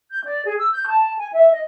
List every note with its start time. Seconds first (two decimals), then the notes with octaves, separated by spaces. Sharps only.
0.11 G6
0.26 D5
0.45 G#4
0.58 E6
0.72 G6
0.87 A5
1.18 G#5
1.33 E5
1.52 D#5